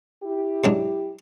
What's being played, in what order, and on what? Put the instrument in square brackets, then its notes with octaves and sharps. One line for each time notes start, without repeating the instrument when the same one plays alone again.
[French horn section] E4 G4
[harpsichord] G#2 F#3 D4